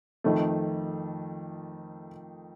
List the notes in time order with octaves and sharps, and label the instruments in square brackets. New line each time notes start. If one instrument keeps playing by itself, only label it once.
[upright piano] F2 D#3 A3